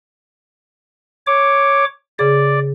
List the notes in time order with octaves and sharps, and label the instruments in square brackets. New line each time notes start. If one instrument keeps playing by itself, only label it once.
[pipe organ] C#5 D6
[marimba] C#3 G#4 [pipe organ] D5